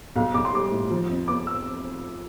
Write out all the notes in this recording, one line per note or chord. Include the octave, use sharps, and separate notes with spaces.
B1 F5
B1 D6
C6
G3 D6
A2
F3
F2
B3 D6
E6